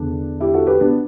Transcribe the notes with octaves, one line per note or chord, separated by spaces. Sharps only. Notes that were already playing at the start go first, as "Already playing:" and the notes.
Already playing: E2 D3 D4
E4 G4
F#4 A4
G4 B4
B3 D4